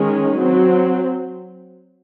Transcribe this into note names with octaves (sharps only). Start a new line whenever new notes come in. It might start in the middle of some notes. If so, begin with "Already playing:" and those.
Already playing: D#3 G#3 C#4
F#3 C4